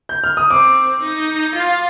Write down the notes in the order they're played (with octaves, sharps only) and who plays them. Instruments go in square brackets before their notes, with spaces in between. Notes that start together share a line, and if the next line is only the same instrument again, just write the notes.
[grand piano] G6
F6
D#6
[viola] C4 [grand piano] D6
[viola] D#4
F4